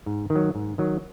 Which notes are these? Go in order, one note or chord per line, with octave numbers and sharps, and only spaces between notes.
G#2
D#3
F#3
G#2
D#3 F#3